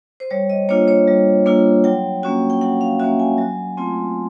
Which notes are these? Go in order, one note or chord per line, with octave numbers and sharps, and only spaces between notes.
C5
G3 C#5
D#5
A#3 D4 F4 C#5
C#5
G3
A#3 D4 F4
F#3 G5
A#3 C#4 F#4
G5
F#3 F#5
F5
A#3 C#4 F#4 E5
G#5
F#3
A3 C4 F4